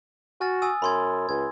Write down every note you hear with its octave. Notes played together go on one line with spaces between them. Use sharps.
F#4 G#5 F6 A6
G#5 D#6 E6
F#2 B5 C6 G#6
C#2 G#6